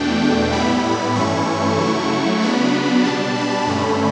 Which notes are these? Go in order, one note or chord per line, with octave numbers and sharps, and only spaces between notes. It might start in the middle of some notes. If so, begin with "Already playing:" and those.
Already playing: E2 B2 A3 D4 G5
A2 G3 B3 E4 B5
G2 E3 A3 C#4 E4 C#6
C#3 F#3 A3 E4
C#3 F#3 B3 D4 B5
B2 G3 D4 A5
B5
G2 D3 A3 C#4